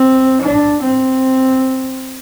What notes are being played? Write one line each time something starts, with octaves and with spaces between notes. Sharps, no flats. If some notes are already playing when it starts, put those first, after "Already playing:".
Already playing: C4
D4
C4